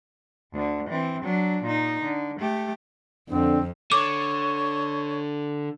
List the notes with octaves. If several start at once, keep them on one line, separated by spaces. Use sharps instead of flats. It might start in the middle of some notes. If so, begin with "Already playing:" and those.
D2 D3
E3 C4
F#3 D4
A#2 D#4
D3
A3 G4
F2 D3 C4
D3 C#5 D6